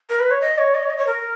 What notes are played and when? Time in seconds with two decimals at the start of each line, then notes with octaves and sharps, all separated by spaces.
0.10 A#4
0.20 B4
0.31 C#5
0.42 D#5
0.58 C#5
0.75 D#5
0.83 C#5
0.90 D#5
0.98 C#5
1.07 A#4